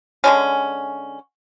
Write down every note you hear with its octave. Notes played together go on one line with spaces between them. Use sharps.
D3 G#3 C#4